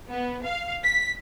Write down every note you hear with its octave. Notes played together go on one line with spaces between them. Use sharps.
B3
F5
B6